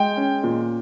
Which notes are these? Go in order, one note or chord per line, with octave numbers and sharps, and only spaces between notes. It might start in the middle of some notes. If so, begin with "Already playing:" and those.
Already playing: G#3 G5
C#4
A#2